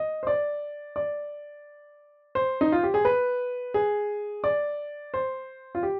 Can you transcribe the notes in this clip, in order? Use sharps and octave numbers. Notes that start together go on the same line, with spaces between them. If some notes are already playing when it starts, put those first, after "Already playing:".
Already playing: D#5
C5
D5
D5
C5
D#4
F4
G4
G#4
B4
G#4
D5
C5
F4
G4